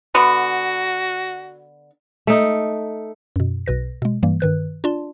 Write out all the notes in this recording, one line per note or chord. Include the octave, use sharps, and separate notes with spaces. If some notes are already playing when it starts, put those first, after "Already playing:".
D3 B3 F#4
A3 D#4
F#2 B2
B1 B2 B4 A#6
B2 G#3
G2 E3 G3 A#3
G2 D#3 B4 F#6
D4 F4 D5 A5 C6